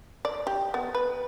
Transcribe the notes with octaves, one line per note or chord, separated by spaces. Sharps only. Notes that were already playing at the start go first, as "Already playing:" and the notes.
D5
G4
B3
B4